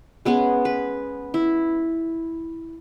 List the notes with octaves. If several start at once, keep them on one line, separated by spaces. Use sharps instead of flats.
G#3 B3 C#4 G#4
B4
E4